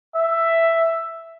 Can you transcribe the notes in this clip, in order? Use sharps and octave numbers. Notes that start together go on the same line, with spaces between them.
E5